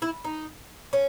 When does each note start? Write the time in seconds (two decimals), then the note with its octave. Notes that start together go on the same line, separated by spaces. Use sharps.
0.02 E4
0.24 D#4
0.93 C#4